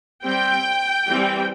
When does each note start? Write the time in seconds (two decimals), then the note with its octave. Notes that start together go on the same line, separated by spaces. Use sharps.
0.23 G3 C4 G5
1.07 E3 G3 C4